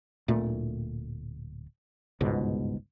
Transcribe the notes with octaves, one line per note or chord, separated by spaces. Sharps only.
D1 A#2 A3
G1 C#2 G#2 B2